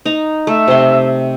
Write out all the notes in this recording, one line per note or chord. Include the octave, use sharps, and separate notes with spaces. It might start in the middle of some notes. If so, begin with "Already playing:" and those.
D#4 A#5
A3 E5
C3 C6